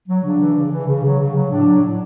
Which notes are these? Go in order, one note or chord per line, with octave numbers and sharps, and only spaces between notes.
F#3
C#3 D4
E3
C#3
E3
C#3
F#3
C#3
F#3
A2 D4
F#3
A2